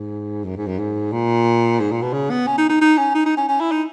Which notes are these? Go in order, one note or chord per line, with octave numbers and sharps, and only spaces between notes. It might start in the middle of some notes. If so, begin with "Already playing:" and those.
Already playing: G#2
F#2
G#2
F#2
G#2
A#2
G#2
A#2
B2
C#3
B3
C#4
D#4
D#4
D#4
C#4
D#4
D#4
C#4
C#4
E4
D#4